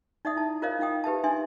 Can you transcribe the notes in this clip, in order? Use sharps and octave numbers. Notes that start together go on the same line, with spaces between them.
D#4 D5 E5 F#5 D#6
E4 A5
F4 A#4 C5 C#5 D#5 F5
D#4 F4 F5 G5 D#6
G4 B4 E5 A5
D4 D#4 E5 G#5 C6